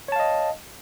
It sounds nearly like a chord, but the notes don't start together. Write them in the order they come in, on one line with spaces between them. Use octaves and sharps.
C#5 A5 F5 D#5